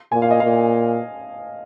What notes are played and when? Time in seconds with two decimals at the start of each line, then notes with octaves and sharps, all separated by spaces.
0.12 A#2 G#5
0.22 F5
0.31 D#5
0.40 A#2 F5